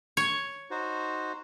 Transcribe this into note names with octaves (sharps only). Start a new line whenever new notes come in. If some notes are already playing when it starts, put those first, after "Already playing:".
C#5
D#4 F#4 C5